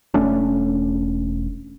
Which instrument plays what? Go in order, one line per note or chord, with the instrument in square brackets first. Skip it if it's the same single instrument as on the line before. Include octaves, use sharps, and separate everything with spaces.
[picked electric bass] E1 A3 C#4 D4